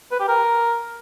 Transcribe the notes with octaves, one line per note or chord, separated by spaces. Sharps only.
B4
G4
A#4